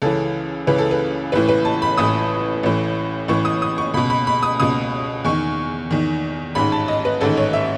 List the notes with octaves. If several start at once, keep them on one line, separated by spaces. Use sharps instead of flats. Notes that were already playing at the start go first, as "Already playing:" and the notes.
C#2 C#3 E3 A4
C#2 C#3 E3 B4
A4
B4
A1 A2 E3 B4
B4
A5
B5
A1 A2 E3 D#6
A1 A2 E3
A1 A2 E3 C#6
D#6
D#6
C#6
C#2 B2 B5
B5
B5
D#6
C#2 B2 D#6
E2 D#3 C#6
E2 D#3
A1 G#2 D#3 B5
A5
D#5
B4
A1 G#2 D#3 A4
C#5
E5